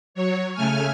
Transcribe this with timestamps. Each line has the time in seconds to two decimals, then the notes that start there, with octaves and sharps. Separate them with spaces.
0.15 F#3 C#5
0.54 C#3 A3 G#5 F6